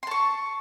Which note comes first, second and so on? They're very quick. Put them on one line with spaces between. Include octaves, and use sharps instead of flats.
C6 A5 C#6